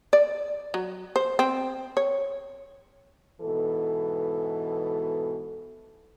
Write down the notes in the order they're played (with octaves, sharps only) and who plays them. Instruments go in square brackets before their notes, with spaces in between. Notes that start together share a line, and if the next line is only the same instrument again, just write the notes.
[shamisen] D5
F#3
C5
C4
C#5
[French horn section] G#2 B2 E3 A4